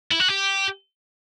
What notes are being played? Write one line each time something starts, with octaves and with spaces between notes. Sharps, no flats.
E4
F#4
G4